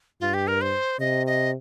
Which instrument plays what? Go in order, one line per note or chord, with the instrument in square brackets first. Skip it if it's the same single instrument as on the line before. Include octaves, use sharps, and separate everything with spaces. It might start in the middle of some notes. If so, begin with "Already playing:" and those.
[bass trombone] G2 [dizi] F4
[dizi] G4
A#4
C5
[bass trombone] C3 [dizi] D#5
[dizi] D#5